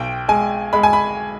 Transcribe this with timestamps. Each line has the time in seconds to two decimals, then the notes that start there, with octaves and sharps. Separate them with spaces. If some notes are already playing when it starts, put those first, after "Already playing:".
Already playing: B1 G5
0.28 G#3 G#5
0.73 G#3 B5
0.83 G#5
0.93 B5